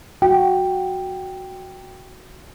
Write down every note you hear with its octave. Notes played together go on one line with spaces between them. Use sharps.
F#4 G5